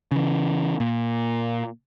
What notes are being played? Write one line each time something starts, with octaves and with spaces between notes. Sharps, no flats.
C#3 E3
A#2